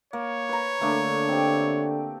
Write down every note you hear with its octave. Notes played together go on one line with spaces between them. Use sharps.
A#3 C#5
B4 A#5
D3 A3 A#3 D4
C4 G4